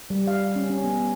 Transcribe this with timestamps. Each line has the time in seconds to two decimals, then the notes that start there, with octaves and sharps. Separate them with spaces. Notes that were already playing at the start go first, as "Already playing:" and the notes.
0.10 G3
0.27 F5
0.56 C#4
0.70 C#4
0.84 B3